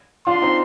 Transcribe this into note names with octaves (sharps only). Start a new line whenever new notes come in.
D4 F4 C6
C4 D#4